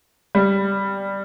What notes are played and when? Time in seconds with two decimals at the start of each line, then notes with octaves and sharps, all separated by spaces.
0.35 G3